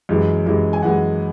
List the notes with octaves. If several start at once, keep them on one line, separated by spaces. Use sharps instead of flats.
F#2 E3 G#3
F#2 E3 G#3
G#5
F#2 E3 G#3 F#5